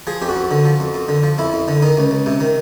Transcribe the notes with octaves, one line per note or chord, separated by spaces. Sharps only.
F3 G#4
F2 G4
F#4
F2
D3
F3
F2
F2
D3
F3
F2 E4
F2
D3
D#3 D#4
C#2
C#2
C3
D#3